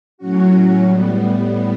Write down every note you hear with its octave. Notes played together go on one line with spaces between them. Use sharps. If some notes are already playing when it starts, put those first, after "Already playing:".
A2 F#3 C#4 F#4
A2 G3 B3